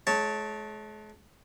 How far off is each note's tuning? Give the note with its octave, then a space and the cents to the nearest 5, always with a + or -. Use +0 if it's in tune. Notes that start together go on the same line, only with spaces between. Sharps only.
G#3 +40 C#5 +0 A5 +0